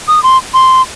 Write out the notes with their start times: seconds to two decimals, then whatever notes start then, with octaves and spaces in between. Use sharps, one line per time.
0.08 D#6
0.23 C6
0.54 C6